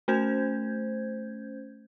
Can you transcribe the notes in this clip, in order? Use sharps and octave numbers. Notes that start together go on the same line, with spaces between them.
A3 C#4 C5 G6 G#6